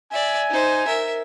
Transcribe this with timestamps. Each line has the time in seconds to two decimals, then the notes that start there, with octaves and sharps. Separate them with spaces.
0.12 D5 E5 G#5
0.50 D#4 C5
0.87 A#4 E5